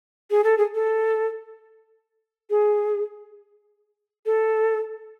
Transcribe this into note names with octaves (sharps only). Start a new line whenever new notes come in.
G#4
A4
G#4
A4
G#4
A4